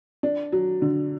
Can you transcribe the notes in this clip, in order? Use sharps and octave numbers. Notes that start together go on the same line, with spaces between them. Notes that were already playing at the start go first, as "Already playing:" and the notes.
D4
F#3
D3